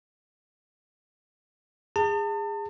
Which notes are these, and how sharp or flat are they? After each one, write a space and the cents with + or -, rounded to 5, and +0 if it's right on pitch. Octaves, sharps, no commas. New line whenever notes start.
G#4 -25 A5 +35